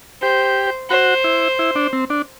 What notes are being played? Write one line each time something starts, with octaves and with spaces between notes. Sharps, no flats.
G4 C5
F#4 C5
E4
E4
D4
C4
D4